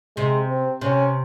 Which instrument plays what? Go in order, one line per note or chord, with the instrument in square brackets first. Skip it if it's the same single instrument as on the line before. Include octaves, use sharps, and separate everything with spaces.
[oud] C3 [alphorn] G#3
[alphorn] C4
[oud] C3 [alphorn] C#4